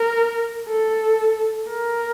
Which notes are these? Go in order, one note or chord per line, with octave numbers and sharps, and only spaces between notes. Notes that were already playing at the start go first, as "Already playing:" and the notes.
Already playing: A#4
A4
A#4